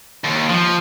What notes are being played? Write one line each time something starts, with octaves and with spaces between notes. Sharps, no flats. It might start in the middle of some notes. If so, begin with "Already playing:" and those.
D#2
F3